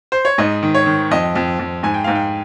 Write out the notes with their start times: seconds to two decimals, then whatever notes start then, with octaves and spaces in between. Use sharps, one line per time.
0.12 C5
0.25 C#5
0.38 G#2 D#5
0.63 D#3
0.75 C#5
0.86 D#3
1.11 F2 D#5
1.35 F2
1.59 F2
1.83 G#2 G#5
1.94 G5
2.04 G#2 F5
2.15 G5